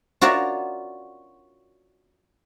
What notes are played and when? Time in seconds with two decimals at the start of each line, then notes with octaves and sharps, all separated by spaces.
0.21 F4 F#4 A#4 C#5 D5 E5